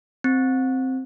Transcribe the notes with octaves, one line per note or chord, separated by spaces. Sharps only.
C4